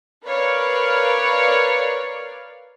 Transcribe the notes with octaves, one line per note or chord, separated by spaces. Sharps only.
A#4 B4 C#5 D5 F5